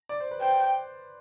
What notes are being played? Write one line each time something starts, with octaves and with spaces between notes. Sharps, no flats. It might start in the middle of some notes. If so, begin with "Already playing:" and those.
D5
C5
B4
C5 G5